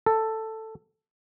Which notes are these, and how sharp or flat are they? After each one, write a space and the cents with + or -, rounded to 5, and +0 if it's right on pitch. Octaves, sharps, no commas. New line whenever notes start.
A4 +5